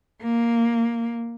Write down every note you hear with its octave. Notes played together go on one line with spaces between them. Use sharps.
A#3